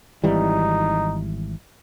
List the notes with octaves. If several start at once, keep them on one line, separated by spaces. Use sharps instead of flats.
G#1 E3 G3 D#4